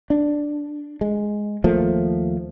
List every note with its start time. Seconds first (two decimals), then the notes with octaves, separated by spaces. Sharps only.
0.10 D4
1.01 G#3
1.64 D#2 F3 A3 A#3